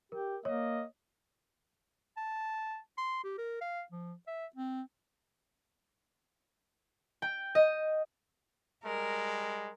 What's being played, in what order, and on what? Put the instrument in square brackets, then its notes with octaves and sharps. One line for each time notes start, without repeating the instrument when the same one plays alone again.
[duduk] G4 [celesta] A#4
[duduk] A#3 [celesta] C#5 [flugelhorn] D#5
[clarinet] A5
C6
G4
A#4
F5
F3
E5
C4
[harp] G5
D#5
[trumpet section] G3 G#3 [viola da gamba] A#4